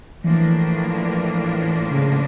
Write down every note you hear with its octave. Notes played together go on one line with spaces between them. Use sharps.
A2 E3 F3 A#3 D4
C#3